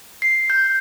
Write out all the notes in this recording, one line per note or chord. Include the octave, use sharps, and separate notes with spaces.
C7
G6